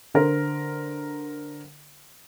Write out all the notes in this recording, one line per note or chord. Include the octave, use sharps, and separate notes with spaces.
D3 A#4 C5